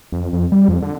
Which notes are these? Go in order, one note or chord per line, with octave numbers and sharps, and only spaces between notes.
F2
F2
G3
F2
D3